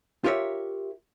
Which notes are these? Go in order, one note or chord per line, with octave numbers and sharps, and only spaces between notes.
F4 G4 A#4 C#5 E5